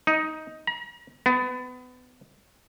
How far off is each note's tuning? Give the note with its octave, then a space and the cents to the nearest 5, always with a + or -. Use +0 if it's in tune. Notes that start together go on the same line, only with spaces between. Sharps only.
D#4 +10
A#5 +40
B3 +25